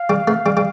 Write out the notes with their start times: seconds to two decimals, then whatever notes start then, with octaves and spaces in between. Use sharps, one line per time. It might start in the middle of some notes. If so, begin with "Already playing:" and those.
Already playing: F5
0.10 G3
0.28 A3
0.46 G3
0.57 G3